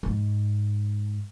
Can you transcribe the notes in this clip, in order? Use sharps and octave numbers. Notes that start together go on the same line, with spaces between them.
G#2